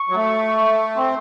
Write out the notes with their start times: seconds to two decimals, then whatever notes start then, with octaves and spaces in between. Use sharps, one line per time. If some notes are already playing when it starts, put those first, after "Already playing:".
Already playing: C#6
0.09 F#3
0.15 A3
0.96 C4 C6